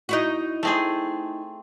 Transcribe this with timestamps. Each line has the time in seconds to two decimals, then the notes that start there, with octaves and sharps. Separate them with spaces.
0.09 D#4 E4 F#4
0.63 A3 C4 G#4